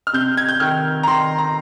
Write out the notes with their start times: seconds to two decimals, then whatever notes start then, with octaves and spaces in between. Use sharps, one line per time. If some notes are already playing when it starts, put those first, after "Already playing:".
0.07 F6
0.13 C3 G6
0.37 G#6
0.49 G6
0.60 D#3 F6
1.03 A#5
1.07 D#3 C6
1.38 A#5